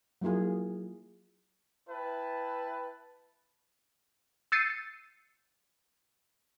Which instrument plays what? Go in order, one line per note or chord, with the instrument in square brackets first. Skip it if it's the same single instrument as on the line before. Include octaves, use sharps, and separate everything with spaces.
[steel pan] F#3 A#3 E4 F4 G#4
[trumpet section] E4 B4 G5 A5
[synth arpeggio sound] E6 G6 A6 C7 C#7 D#7